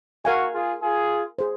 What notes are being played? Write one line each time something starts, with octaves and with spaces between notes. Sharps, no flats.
F#4 A#4 F5 G#5
F4 G#4
F4 G#4
G#4 C5